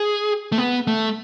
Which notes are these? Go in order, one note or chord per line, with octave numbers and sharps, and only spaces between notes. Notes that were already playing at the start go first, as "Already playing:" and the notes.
Already playing: G#4
A3
B3
A3